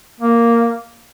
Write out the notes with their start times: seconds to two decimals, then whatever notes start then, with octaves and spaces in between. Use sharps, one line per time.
0.20 A#3